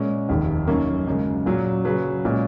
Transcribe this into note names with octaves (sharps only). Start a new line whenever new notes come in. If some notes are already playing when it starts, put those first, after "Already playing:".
Already playing: A#2 G#3 C#4
F1 D#2 D#3
F#2 D#3 A#3 C#4
F#2 C#3 G#3
A#2 F#3 C#4
C#3 F#3 C#4 G#4 B4
A#2 G#3 C#4